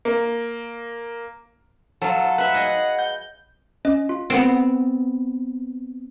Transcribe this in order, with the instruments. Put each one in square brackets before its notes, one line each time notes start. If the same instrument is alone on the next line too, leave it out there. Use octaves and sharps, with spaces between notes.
[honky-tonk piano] A#3
[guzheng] F#3 F4 [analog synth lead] A4
[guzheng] B4 E5 [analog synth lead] F#5
[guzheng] G#4 D#5 G#5
[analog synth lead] G6
[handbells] C#4 D#5
F4
[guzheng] B3 C4